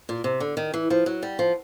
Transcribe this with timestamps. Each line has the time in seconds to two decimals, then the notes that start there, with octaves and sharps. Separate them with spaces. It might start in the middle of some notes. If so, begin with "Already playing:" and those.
0.09 A#2
0.24 C3
0.40 D3
0.57 D#3
0.74 E3
0.90 F3
1.06 F#3
1.22 G3
1.39 F3